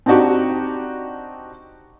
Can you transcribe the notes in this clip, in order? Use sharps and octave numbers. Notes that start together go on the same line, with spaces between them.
C4 D4 D#4 F#4 G4